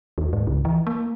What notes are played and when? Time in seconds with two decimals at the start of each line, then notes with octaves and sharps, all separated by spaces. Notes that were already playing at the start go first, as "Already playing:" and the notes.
0.18 D#2
0.33 G#2
0.47 C#2
0.65 E3
0.87 A#3